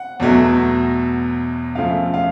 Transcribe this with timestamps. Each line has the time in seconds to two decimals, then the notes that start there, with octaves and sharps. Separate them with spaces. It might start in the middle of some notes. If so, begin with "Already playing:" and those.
Already playing: F#5
0.20 E2 B2 F#3 A3
1.75 F#2 C#3 F3 A3 F5
2.14 F5